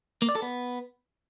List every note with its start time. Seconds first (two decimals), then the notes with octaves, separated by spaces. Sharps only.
0.22 A#3
0.29 D5
0.35 A4
0.42 B3